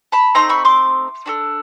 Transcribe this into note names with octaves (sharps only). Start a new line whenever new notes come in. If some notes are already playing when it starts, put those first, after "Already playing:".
A5 B5
A3 C4 D#4 A#5 C6
B5 C#6
C6 D6
D4 F#4 A4